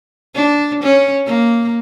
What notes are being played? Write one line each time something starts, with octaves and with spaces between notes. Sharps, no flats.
D4
C#4
A#3